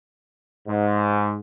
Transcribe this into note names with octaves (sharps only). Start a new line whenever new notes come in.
G#2